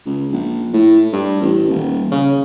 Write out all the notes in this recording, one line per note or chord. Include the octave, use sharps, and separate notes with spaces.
C#2
A#1
A2
G2
A1
D#1
C#3